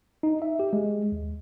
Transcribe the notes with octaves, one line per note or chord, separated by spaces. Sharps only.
D#4
E5
G4
G#3
D#2